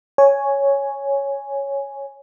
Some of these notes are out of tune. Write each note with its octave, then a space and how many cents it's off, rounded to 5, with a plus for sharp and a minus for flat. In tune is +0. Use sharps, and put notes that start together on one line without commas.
C#5 +0 G#5 +0